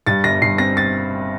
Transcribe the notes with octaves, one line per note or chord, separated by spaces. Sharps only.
G2 A6
G1 A#6
G2 C7
C4 A#6
A6